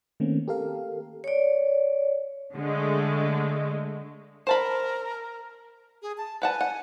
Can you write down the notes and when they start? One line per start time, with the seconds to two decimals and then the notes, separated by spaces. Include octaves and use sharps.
0.20 D#3 A3 A#3 C4 C#4
0.48 G4 A4 A#4 F5
1.24 C#5 D5
2.55 D3 G#3 A3
4.47 A#4 C5 A5 B5
6.02 G#4
6.18 A5
6.42 B4 F#5 G#5 A5
6.61 F#5